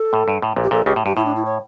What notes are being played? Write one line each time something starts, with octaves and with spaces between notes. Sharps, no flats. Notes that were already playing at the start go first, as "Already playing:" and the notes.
Already playing: A4
A2
G2
A2
A#1 A#2
G4
A#1 A#2 A4
C#2 C#3 G4
A2
G2 G4
A2 E4
D4
E4
C#5